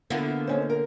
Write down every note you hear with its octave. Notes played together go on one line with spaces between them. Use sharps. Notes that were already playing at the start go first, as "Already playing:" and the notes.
D3 A#3 B3 E4 A5
D#2 C#4 C5
A#4